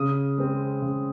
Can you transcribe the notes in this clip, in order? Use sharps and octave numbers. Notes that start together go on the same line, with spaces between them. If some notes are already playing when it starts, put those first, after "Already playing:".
Already playing: C#3 D#6
G#3 C4
C#3